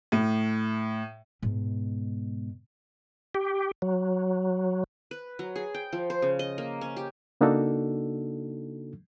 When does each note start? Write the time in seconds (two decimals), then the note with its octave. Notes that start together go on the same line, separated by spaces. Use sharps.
0.12 A2
1.42 G#2 B2
3.35 G4
3.82 F#3
5.11 B4
5.39 F#3
5.56 G#4
5.74 G5
5.93 F3
6.10 C5
6.22 C#3
6.39 D#5
6.58 A#3
6.81 C#4
6.97 G4
7.41 C#3 A#3 D4 D#4 F#4 A4